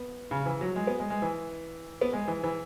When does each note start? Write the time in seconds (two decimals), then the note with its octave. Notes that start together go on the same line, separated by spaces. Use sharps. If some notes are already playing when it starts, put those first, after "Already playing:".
Already playing: B3
0.31 C#3
0.46 E3
0.61 F#3
0.76 G#3
0.87 B3
1.00 G#3
1.10 G#3
1.22 E3
2.01 B3
2.13 G#3
2.28 E3
2.43 E3